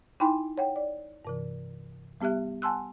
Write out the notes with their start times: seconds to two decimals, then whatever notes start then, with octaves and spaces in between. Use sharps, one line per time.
0.20 D#4 E4 G5 G#5 B5 C6
0.58 C#5 F#5 G5
0.76 D5
1.25 G2 C3 E3
2.20 G3 B3 G4 E5 F#6
2.62 F#5 G#5 A5 C6 E6 F#6